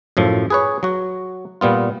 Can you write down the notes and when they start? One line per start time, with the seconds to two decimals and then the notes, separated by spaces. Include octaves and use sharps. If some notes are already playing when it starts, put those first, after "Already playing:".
0.17 F#2 A2 F3
0.50 G#4 B4 C#5
0.83 F#3 F#4
1.61 A#2 G3 B3 F4